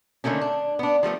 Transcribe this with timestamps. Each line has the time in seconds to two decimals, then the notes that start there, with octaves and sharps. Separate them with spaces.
0.24 D3 D#3 A3 A#3 C#4
0.41 D4
0.79 B3 D4
1.03 F3 G3 A3 B3